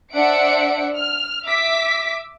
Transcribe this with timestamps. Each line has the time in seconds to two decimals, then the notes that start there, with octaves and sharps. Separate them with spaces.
0.12 D4 C5 E5 F#5 C#7 D7
0.95 F6
1.46 E5 D6 B6